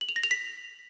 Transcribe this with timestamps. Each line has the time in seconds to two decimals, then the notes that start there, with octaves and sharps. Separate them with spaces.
0.01 F#7
0.09 F7
0.16 A#6
0.23 F7
0.31 B6